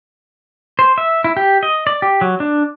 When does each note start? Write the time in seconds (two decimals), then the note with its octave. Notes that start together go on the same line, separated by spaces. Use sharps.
0.79 C5
0.98 E5
1.24 E4
1.37 G4
1.63 D#5
1.87 D5
2.02 G4
2.21 F#3
2.40 D4